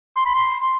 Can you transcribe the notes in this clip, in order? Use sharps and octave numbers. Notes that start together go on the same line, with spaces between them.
C6
B5
C6